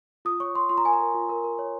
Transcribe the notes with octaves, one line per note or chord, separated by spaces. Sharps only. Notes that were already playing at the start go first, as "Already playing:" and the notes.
F4 D#6
C#5 C#6
C#5 C6
F4 C6
A#5
A#4 G#5
A#5
A#4
F4
A#4
A#4
C#5